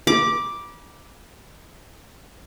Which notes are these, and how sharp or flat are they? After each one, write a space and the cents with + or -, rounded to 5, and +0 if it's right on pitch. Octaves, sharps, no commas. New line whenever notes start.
B5 -40 D6 +0